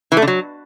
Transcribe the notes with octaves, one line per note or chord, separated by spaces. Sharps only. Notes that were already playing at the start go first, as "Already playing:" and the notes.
E3
A3
D3
F#3